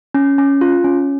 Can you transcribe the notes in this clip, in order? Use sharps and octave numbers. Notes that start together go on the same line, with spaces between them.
C#4
C#4
F4
C#4